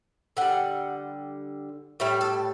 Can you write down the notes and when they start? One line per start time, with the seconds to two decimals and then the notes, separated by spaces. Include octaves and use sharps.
0.37 D3 G3 F#5
2.00 A2 G3 E5
2.21 A4